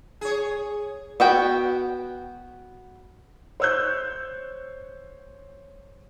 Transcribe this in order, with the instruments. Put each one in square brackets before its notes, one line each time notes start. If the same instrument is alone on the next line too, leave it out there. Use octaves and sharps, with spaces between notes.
[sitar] G#4 C#5
[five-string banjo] B3 F#4 G5
[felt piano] C5 C#5 E6 F#6 G6